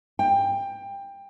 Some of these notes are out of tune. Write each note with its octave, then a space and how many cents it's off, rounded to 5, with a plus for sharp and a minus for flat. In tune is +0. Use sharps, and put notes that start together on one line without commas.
G5 +20